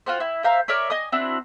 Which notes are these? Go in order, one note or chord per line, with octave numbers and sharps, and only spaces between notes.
F4 F#4 C5
E4
C5 E5 F5 A#5
A#4 C#5 D5 E5
D#5 G#5 D#6
C4 D4 E4 F#4